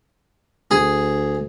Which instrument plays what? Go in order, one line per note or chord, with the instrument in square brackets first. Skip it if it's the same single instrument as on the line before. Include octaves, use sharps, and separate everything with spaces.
[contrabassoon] D2 [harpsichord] G#4